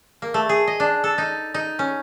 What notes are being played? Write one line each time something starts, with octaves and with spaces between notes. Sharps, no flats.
A#3
A3
G#4
D#5
D4
A4
D#4
D#4
C#4